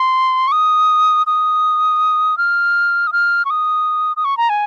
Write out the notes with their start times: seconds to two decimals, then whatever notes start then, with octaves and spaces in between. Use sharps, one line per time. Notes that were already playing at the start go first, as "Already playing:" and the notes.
Already playing: C6
0.48 C#6
0.52 D#6
1.27 D#6
2.38 F6
3.07 D#6
3.13 F6
3.45 C#6
3.50 D#6
4.17 D#6
4.25 C#6
4.37 A#5
4.50 G#5